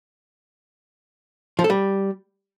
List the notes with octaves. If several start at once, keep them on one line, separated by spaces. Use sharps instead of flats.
F3
A4
G3